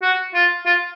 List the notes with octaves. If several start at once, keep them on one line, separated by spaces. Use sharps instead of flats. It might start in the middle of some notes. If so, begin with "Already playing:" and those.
F#4
F4
F4